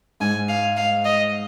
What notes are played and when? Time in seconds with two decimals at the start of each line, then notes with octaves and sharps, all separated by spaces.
0.20 G#2 G#5
0.49 F5
0.77 F5
1.05 D#5